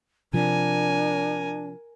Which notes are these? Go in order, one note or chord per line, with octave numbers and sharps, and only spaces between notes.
C3 F3 D4 A#4 G#5